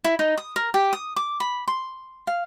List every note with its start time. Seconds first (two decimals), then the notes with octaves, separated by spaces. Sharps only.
0.04 E4
0.19 D#4
0.37 D#6
0.56 A#4
0.74 G4
0.93 D#6
1.16 D6
1.40 B5
1.68 C6
2.27 F5